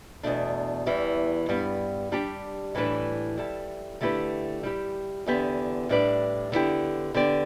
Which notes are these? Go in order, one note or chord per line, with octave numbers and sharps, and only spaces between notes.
E2 B2 A3 D4
E2 E3 G3
G2 G3 B3
G3 D4 G4
A2 E3 G3 D4 B4
G3 E4 A4
D3 A3 E4 G4 B4
G3 E4 G4
E2 D3 B3 G4
A2 G3 D4 B4 D5
D3 B3 E4 G4
D3 B3 G4 D5